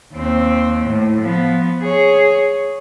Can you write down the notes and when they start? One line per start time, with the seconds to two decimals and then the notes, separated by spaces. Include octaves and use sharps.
0.13 D#2 C4
0.87 A2
1.22 F3 B3
1.82 G#4 C#5